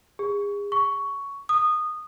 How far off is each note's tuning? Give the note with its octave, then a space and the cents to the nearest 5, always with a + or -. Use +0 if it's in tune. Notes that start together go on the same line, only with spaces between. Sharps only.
G#4 -35
C#6 +10
D#6 -15